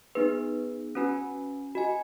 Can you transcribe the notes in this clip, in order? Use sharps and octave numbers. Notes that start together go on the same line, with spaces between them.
B3 D#4 G#4 B4
C#4 F#4 B4 G#5
F#4 D#5 G#5